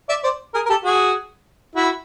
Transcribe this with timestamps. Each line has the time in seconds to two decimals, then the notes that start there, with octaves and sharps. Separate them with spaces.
0.09 D5 E5
0.24 C5 D5
0.54 G#4 A#4
0.66 A#4
0.70 G4 A4
0.85 F#4 G#4
1.76 E4 F#4